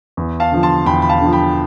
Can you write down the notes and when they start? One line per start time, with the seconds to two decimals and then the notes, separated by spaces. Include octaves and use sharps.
0.17 E2
0.40 F5 A5
0.52 D3 F3
0.63 A5 C6
0.86 E2 G5 B5
1.02 B5
1.09 F5 A5
1.21 D3 F3
1.33 G5 B5